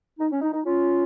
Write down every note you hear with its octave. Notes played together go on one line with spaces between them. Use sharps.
D#4
C#4
D#4
D#4
C#4 F4